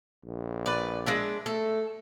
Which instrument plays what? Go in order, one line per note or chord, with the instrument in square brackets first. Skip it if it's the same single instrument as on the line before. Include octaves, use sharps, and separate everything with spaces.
[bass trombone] A#1
[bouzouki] B4 D5
G#3 D4 E5
[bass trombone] A3 [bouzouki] A4